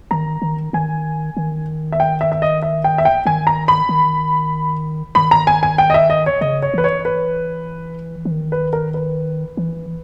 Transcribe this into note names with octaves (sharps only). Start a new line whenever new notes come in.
D#3 A#5
D#3
D#3 G#5
D#3
E5
G5
E5
E5
D#5
E5
G5
E5
G5
D#3 G#5
A#5
B5
D#3
D#3 B5
A#5
G#5
G#5
G5
D#5
E5
D#5
C#5
C#3 D#5
C#5
E3 B4
C#5
B4
E3
D#3
B4
A#4
B4
E3